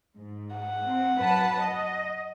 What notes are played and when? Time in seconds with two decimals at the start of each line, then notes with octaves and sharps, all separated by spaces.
0.17 G#2
0.56 F#5
0.85 C4
1.18 F#2 B4 A5
1.61 D#5